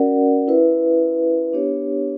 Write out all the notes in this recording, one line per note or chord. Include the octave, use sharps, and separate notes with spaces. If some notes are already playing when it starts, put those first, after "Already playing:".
Already playing: C#4 F#4 A#4 D5 F#5
E4 B4 E5
B3 D4 G4 C#5